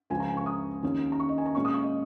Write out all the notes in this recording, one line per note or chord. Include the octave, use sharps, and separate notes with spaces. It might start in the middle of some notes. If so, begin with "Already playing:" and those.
C#2 C#3 F3 G#5
A#5
G#5
C#6
D#6
D#2 D#3 C#4
A#5
C#6
D#5
G#5
A#5
A#2 G#3 C#4 C#6
D#6
C#6
D#5